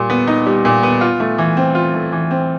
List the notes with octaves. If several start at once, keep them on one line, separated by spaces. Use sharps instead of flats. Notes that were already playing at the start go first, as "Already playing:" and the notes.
Already playing: A#2 G3
B3
D#4
G3
A#2
B3
F4
A3
E3
C4
F4
A3
E3
C4